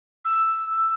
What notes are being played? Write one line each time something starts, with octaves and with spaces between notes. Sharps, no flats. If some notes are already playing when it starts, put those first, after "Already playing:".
E6
E6